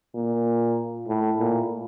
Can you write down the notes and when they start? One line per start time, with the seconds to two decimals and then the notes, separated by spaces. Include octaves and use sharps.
0.14 A#2
1.08 A2
1.39 A#2